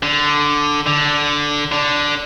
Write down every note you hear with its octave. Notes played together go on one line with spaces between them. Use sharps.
D3
D3
D3